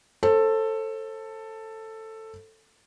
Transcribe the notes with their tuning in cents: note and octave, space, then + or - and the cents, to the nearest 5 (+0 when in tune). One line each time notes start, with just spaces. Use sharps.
A4 +10 C5 +35